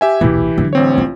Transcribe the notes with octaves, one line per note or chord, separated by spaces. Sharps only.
G4 E5 G#5
D#1 B1 E3 E4 G4
D3 F#3
A1 C4 C#5
F4